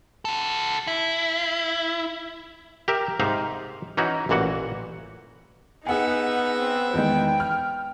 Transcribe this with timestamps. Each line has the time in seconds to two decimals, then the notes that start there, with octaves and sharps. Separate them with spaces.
0.25 F#4 A4
0.87 E4
2.88 G4 A#4 E5
3.20 G#2 C3 D#4 E5 F5
3.97 E3 C#4 D#4 E4 F#4
4.29 A1 A#2 E3 F#4 F#5
5.86 B3 D#4 G#4 E5 F#5 G#5
6.59 C4
6.94 E2 D#3 G#3 G5
7.40 F6